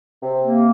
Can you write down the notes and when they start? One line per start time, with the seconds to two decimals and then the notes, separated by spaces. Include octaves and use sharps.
0.22 C3
0.44 A#3